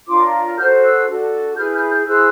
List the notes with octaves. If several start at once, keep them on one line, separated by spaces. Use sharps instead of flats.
D4 F4 A#4 C#5 C6 D6
F#4 A4 C5 F6 G6
E6 F#6
D4 F#4 A4
E4 G#4 B4 F6 G6
F6 G6
F6 G6
E4 G#4 C5 E6 F#6